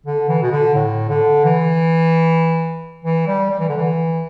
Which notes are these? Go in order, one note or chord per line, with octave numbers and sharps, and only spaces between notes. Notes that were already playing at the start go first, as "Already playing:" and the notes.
D3
E3
B2
D3
A2
D3
E3
E3
G3
G3
E3
D3
E3